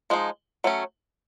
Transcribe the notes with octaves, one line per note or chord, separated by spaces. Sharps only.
F3 G#3 D#4
F#3 A3 C#4